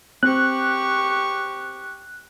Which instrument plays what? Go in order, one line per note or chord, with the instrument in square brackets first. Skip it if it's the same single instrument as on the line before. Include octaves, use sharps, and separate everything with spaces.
[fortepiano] C4 [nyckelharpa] G4 C#6 [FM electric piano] F#6